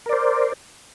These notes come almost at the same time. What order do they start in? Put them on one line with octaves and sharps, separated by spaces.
A#4 D5 C5